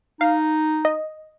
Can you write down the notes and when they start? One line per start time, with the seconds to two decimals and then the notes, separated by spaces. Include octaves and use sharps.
0.21 D#4 F5
0.85 D#5